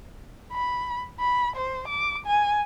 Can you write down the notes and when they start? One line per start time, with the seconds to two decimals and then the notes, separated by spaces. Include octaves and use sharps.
0.53 B5
1.20 B5
1.56 C5
1.88 D6
2.26 G#5